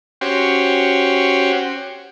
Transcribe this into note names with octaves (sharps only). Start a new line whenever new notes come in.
C#4 F#4 G4 C5